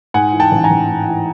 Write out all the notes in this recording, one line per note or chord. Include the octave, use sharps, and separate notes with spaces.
G#2 F#5 G#5
E3
G5 A5
A1
G#5 A#5
A1
G#2
E3